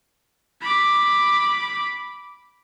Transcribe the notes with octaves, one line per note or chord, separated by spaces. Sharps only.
B5 D6